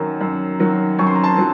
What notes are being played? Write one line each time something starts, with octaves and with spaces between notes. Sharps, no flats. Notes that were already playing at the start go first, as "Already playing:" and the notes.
Already playing: F#2 D#3 F#3
F#2
D#3 F#3
F#2 C#6
C6
A#5
A5 C6
F#3